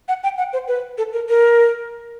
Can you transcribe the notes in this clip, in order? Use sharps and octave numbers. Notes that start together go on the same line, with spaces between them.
F#5
G5
F#5
C5
B4
A4
A#4
A#4